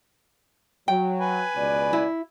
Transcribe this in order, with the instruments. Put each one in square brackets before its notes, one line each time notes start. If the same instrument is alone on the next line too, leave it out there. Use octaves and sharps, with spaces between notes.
[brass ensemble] F#3 [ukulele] G5
[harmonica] B4 G#5
[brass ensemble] C#2 B2 D5
[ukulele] E4